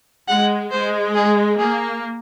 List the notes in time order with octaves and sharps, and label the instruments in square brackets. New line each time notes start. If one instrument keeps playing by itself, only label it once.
[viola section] G#3 [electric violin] F#5
[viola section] G#3 [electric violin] C5
[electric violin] G#4
[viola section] A#3 [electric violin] G#4